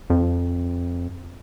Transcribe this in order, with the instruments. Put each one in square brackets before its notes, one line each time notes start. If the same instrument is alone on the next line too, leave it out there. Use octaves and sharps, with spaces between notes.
[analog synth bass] F2